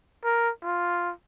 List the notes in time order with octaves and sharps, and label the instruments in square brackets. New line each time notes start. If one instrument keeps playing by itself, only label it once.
[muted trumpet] A#4
F4